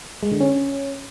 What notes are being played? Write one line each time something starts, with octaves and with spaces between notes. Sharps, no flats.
G#3
D3
C#4